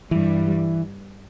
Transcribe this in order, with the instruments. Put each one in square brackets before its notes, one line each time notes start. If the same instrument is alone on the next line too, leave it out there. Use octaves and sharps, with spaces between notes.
[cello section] G2 G3 [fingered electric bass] E3